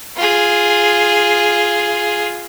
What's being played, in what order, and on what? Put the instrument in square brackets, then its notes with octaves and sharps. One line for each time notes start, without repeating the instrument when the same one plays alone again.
[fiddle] F4 G#4